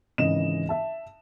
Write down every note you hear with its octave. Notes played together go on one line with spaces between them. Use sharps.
G#1 C#3 E3 D#5 E7
E5 A5